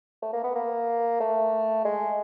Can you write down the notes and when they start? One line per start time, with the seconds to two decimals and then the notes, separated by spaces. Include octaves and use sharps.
0.22 A3
0.33 A#3
0.44 B3
0.55 A#3
1.20 A3
1.85 G#3